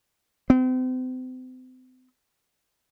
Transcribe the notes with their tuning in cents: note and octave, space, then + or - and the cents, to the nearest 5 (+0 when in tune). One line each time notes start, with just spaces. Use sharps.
C4 -40